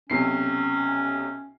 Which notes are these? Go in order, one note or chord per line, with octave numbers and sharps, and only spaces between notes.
B1 C3 C#4 C7